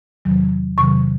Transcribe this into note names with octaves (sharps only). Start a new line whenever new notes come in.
E2 C3 D#3 F#3
E2 C3 D#3 F#3 C#6